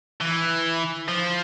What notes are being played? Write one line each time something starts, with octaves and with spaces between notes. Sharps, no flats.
E3
F3